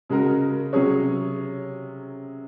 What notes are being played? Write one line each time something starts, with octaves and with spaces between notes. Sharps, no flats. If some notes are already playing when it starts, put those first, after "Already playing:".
C#3 G#3 C#4 F#4 A#4
C3 F#3 C#4 G#4 C#5